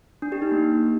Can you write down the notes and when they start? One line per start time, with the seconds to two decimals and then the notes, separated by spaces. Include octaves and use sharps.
0.22 D4
0.32 G4
0.42 D#4
0.52 A#3